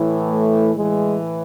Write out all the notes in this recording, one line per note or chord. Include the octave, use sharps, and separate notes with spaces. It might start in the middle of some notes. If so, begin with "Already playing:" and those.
Already playing: A2 E3
A3
A2 E3 G#3